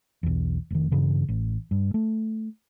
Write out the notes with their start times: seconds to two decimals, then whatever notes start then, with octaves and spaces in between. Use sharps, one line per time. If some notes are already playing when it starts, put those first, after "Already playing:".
0.23 B1 E2
0.70 F1 D#3
0.91 G2 C#3 E3
1.29 A1
1.71 G2
1.94 A3